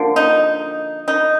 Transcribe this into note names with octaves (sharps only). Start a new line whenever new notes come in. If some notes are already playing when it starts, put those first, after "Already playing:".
Already playing: D3 F3 A#3
D#4
D#4